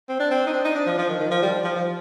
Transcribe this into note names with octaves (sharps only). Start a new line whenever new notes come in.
C4
D4
C4
D#4
D4
D#4
D4
F3
F3
D#3
D#3
F3
G3
F3
F3